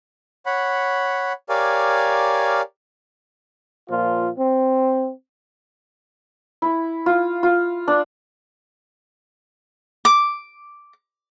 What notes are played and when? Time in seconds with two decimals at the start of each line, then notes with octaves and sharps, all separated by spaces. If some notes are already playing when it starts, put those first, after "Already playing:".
0.46 C#5 F#5 B5
1.49 G4 A#4 C#5 D5 F5 G#5
3.89 A#2 F3 F4
4.38 C4
6.62 E4
7.06 F4
7.43 F4
7.88 D4
10.05 D6